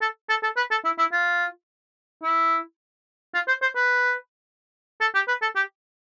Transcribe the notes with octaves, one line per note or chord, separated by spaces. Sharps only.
A4
A4
A4
B4
A4
E4
E4
F4
E4
F4
C5
C5
B4
A4
G4
B4
A4
G4